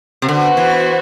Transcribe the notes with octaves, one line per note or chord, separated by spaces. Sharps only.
C3
D3 B3 F#4 C5
E3